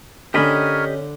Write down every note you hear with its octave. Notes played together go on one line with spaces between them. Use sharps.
D3 C#4 D4 G4 A#4 C#5 D#5 B5